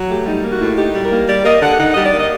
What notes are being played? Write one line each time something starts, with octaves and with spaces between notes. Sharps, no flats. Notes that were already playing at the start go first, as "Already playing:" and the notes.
Already playing: F#3
A3 G4
G3 D#4
A#3
F#4
A2
D#4 G4
G3
A#4
A#3
G3 D5
A#3 D#5
D3 F#5
D#4 F#5
G3 D#5
D5
A#3 D#5